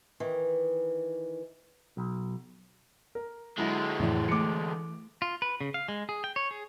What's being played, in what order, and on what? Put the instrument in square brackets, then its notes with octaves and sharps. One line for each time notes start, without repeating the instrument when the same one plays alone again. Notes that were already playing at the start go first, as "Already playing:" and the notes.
[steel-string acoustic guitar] D#3 E3
[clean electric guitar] B1
[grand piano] A#4
[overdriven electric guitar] D3 G#3 [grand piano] F#3 E4 A#6
[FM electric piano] F2 D5 [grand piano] A2 E3
[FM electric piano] E3 A3 [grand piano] D6 C#7
[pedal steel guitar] F4
B4
C#3
F5
G#3
G#4
G5
C#5
G#4